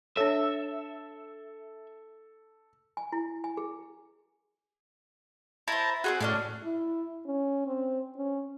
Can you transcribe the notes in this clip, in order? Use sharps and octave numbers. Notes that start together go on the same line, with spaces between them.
D4 A4 C#5 E5
G#5
E4
G#5
G#4
E4 C5 A5 A#5
C4 F4 F#4 G#4
A2 C#4 D4 E4
E4
C#4
C4
C#4